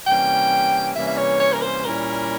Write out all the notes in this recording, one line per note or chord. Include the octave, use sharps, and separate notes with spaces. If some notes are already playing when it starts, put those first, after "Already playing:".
C3 E3 G3 A#3 C#4 G5
C3 E3 G3 A#3 C#4 E5
E5
C#5
C#5
A#4
C5
A#2 G3 C#4 E4 A#4